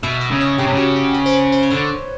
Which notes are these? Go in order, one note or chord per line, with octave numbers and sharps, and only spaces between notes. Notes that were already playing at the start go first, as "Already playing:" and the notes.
B2 E5
D#5
C#3
C#5
C#3 G4
C3
C#3 F#4
G4
B4
C5
B4
C5
C#5
D3 C5